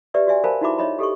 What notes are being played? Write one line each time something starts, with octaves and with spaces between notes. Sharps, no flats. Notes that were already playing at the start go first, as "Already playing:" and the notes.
G4 B4 D5 E5 E6
F#4 D5 E5 G#5
A#4 C5 F5 G#5 A5 B5
D#4 E4 F#4 E5 B5 D6
D#4 C#5 D#5 E5 B5
G4 A4 D#5 C#6